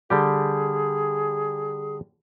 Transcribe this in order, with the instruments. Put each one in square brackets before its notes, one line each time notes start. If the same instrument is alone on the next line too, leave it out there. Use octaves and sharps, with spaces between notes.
[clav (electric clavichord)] D3 G3 G4 [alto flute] G#4